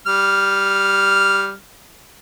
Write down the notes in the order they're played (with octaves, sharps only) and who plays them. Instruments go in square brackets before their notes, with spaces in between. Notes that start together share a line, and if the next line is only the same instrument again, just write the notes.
[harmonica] G3 F6